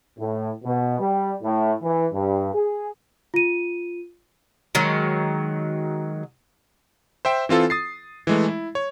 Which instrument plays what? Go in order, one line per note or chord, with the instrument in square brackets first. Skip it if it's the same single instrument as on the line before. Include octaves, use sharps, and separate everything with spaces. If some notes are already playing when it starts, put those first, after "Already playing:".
[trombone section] A2
B2
G3
A2
E3
G2
G#4
[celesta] F4 D#7
[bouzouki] D#3 F#3 G#3
[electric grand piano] C5 E5 G5
E3 C4 F4 A4
D#6 A6 C7
E3 G#3 A3
E4
C#5